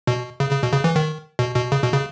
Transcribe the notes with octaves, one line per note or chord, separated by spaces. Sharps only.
B2
C#3
C#3
B2
C#3
E3
D#3
B2
B2
C#3
B2
C#3